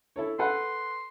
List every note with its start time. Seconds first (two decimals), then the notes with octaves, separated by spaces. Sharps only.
0.16 E4 A4 C#5
0.39 A4 B4 F#5 C6